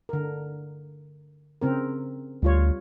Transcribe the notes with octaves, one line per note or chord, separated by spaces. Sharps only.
D3 A#4
C#3 C4 A#4
D2 G3 F4 C#5